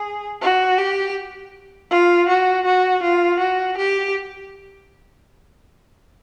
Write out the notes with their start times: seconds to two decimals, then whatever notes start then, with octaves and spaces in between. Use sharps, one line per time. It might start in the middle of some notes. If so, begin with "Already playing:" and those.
Already playing: G#4
0.42 F#4
0.78 G4
1.91 F4
2.28 F#4
2.65 F#4
3.03 F4
3.39 F#4
3.77 G4